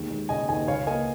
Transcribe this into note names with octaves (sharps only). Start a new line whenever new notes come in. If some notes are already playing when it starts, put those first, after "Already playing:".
Already playing: D#2 G#3
G#3
C#3 D#5 G#5
D#2 D#5 G#5
C#2 C#5 F5
A#3 D#5 G#5